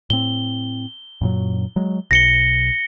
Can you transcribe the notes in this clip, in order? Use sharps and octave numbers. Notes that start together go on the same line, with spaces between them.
A2 C4 G7
F#2 A#2 F#3
F#3 G#3
B1 B2 A#6 C#7 G7